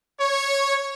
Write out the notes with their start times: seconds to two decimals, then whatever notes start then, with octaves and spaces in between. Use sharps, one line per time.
0.20 C#5